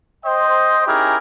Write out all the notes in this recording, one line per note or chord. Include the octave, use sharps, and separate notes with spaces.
C5 D#5 G5
C#4 D#4 E4 G4 G#4 A#4